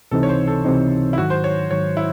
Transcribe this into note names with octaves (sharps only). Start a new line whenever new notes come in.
C#2 C3 E3 C4 D#4 A4
C#5
C5
A4
C#2 C3 E3 C4 D#4
E4
G#2 D#3 F#3 F#4
C5
C#5
G#2 D#3 F#3 C#5
E4